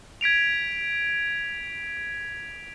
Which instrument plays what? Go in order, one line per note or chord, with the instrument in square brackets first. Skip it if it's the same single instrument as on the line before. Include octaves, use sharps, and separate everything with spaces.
[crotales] G#6 B6 D7 F7